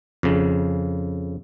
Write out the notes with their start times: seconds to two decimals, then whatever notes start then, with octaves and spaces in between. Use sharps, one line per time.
0.23 F2 C#3